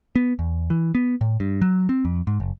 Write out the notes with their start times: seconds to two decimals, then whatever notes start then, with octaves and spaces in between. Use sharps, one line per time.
0.16 B3
0.39 E2
0.70 E3
0.95 B3
1.21 A2
1.40 G2
1.62 F#3
1.89 C4
2.05 F2
2.27 G#2
2.40 F#1